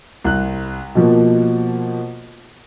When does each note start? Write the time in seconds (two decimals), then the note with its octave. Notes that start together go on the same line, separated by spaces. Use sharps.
0.24 C2 F#6
0.95 B2 F3 A#3